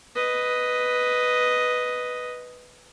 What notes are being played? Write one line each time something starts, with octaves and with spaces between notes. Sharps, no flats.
B4 D#5